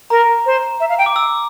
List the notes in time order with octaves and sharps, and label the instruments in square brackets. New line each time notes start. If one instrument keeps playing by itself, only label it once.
[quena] A#4 [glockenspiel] A#5
[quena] C5
E5
F5
G5
[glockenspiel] D6
E6